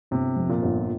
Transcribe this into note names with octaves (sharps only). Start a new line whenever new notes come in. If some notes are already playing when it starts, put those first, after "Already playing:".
G1 C3
F2
A#2
G1